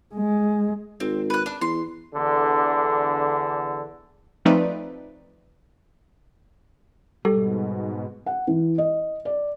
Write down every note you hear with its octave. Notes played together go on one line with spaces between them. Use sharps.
G#3
G#1 C4
B4 F#6
D4
E2 C6
E2 D3
F3 A3 C4 D#4 B4 D5
G#2 B2 G3 G4 A4
F#5
E3
D#5
D5